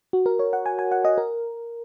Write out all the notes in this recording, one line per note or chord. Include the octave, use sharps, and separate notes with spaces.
F#4
A#4
C#5
F#5
G#5
G#5
F#5
D#5
A#4